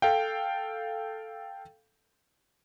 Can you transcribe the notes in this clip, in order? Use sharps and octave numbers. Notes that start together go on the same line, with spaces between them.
A4 F5 G5